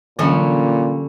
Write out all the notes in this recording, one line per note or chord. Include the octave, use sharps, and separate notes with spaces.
A#2 D3 E3 F#3 G3 C#4